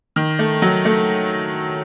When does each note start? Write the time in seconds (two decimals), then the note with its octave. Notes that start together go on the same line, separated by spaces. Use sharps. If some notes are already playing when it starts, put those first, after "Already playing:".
0.16 D#3
0.39 A3
0.62 F#3
0.85 A3